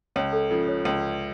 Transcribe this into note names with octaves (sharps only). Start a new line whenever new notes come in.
C#2 C#5
A4
C#3 F3 A4
C#5
C#2